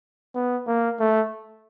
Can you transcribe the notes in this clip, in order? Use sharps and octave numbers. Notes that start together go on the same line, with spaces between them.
B3
A#3
A3